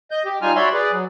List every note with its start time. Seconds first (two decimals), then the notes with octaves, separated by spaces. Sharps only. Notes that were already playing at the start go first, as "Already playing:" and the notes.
0.11 D#5 G6
0.25 G4
0.42 G3 D#4 F4 G#5 F6
0.56 F#4 C#5 D5 E5 B5 C6
0.74 G#4 B4 D5
0.92 F#3